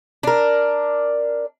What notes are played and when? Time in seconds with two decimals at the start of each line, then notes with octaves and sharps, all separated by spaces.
0.23 D4 A#4